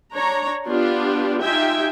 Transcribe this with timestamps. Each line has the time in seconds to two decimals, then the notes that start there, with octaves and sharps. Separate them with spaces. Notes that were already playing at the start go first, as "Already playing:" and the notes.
0.13 D4 C#5 A#5
0.67 B3 D4 F4 G4
1.41 D#4 F4 G4 E5 G5 G#5